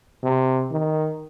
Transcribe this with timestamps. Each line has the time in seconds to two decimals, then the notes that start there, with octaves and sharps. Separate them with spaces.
0.24 C3
0.71 D#3